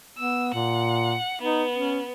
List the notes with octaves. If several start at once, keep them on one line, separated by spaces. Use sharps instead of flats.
B3 E6
A#2 F#5
B3 D#4
C#4